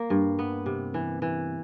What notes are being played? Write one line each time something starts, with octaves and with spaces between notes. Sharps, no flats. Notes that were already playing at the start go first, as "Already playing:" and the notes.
Already playing: A#3
G2
B3
C3
E3
E3